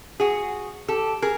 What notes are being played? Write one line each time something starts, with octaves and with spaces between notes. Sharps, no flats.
F#4 G#4
G4 A4
G#4 A#4